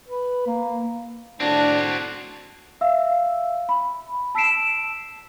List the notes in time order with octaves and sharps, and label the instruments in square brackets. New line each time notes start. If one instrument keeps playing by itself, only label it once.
[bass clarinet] B4
A#3
[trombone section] A2 D4 [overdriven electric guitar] C4 F#4
[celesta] E5 F5 E6
B5
A5 E6 B6 C7 D7 E7